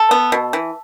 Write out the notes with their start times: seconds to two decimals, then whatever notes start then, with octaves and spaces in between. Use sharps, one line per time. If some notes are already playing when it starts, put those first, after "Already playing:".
Already playing: A4
0.11 B3
0.32 B2
0.53 E3